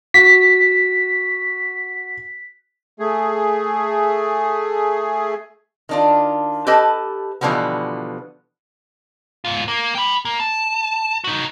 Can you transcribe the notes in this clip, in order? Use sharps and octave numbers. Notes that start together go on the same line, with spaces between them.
F#4 B6
A3 G#4
D#3 D4 F4
G4 A4 B4 D#5 A5
B2 D3 E3 F3 G3 B3
G#2 F4
A#3
G5 B5
A#3
A5
D#4 F#4